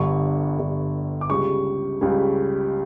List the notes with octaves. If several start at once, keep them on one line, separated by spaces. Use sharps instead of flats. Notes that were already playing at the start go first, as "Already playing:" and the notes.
Already playing: G1 G2 D3 C#6
G1 G2 D3
D6
C#2 C#3 G3 C#6
C#2 C#3 G3